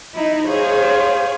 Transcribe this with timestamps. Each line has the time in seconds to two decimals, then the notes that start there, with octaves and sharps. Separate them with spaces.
0.15 D#4 E4
0.47 G#4 C5 C#5 F5